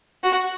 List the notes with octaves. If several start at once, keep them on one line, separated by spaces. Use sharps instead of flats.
F#4